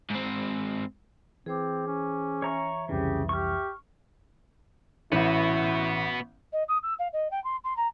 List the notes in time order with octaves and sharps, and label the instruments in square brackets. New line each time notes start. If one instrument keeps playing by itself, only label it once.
[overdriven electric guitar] G#2 C4
[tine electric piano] E3 [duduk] C4 [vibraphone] G#4 C5 D6
[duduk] C#4
[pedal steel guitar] C#5 A#5 C#6 [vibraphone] E5
[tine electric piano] C2 F2 E3 [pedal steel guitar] C#3 [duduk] G4
[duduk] G4 [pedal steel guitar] C#6 F6
[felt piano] A1 [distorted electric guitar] B3 F#4 [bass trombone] E4
[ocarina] D#5
D#6
E6
F5
D#5
G5
C6
C6
A#5